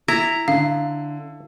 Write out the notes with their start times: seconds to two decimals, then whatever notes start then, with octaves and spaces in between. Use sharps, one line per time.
0.08 E4 A#5
0.48 D3 F5